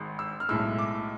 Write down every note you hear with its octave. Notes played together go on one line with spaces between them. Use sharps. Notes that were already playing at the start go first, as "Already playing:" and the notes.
Already playing: G#1 G#2 G#3
E6
F6
B1 A2 G#3 E6
D6